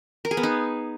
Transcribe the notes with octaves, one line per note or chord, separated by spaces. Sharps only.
A#4
G#4
B3
D#4